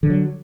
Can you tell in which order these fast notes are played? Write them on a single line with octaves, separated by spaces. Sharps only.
D3 F3 F#3